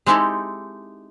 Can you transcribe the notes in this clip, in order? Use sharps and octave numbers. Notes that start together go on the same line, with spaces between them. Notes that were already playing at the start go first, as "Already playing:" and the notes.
G#3 C4 D#4 E4 G4 A4